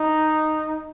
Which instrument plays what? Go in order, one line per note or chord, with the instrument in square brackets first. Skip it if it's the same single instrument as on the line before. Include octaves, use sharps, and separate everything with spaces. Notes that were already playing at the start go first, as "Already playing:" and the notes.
Already playing: [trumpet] D#4